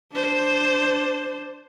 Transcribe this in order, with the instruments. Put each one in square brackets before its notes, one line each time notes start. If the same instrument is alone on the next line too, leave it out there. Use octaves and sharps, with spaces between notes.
[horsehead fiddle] D4 C5